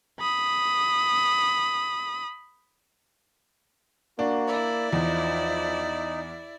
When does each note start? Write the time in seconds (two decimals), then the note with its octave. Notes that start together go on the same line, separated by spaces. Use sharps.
0.20 B5 D#6
4.19 A#3 D4 F#4
4.48 E4 D5 E5 B5
4.92 E2 F3 D#4